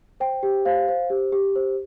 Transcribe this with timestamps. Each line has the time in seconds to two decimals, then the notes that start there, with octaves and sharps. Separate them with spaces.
0.20 C5 G5
0.43 G4
0.65 C5 F5
0.88 C5
1.10 G4
1.32 G4
1.56 C5